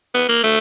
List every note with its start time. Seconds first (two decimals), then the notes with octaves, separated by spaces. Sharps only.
0.14 B3
0.29 A#3
0.43 A3